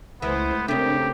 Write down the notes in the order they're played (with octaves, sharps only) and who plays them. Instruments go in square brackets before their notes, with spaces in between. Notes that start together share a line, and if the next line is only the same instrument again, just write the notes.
[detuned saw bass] C#2 [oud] E3 [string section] G#3 A3 C5 [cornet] B3
[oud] C#3 A3 [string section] C4 A#4 [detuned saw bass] D4 [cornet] G4